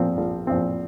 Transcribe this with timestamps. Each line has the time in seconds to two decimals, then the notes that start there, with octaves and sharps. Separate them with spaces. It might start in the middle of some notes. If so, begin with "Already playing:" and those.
Already playing: A#1 A#2 F3 C4
0.18 A#1
0.47 A#2 F3 C4